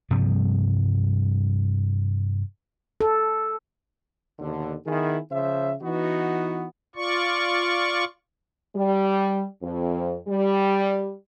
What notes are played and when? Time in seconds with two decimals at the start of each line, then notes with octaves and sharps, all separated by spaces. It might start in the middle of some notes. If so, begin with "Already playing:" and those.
0.11 G2 C3 F3 G3
3.01 A4
4.39 D#2 B2 D3
4.86 D#3 B3 E4 G#4
5.31 C#3 F3 C5 E5
5.82 E3 B3 D#4 F#4
6.96 F4 D5 C#6
8.75 G3
9.62 F2
10.28 G3